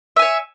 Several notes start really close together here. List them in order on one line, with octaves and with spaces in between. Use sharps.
E5 G#5 C#5